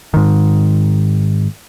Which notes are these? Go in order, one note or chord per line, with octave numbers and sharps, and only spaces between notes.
G#2 D#3